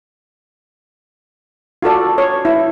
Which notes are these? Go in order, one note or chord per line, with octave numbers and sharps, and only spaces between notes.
F4 F#4 A4 D5
C#5
E4